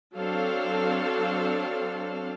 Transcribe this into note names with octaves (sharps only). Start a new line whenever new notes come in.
F#3 C4 D4 A4 F5